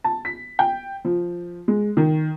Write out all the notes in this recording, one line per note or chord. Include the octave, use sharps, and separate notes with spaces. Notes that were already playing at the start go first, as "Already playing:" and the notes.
A5
B6
G5
F3
G#3
D#3